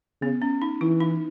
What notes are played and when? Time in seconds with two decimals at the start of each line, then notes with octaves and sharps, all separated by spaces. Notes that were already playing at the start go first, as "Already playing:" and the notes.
0.21 C#3 B3
0.42 C#4
0.62 D#4
0.81 E3 E4
1.01 D#4